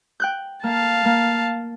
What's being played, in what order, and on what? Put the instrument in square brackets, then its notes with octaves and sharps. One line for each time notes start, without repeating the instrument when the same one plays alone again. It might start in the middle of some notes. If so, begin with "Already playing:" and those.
[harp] G5 F#6 G6
[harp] A#3 [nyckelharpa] F5 A5
[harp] A#3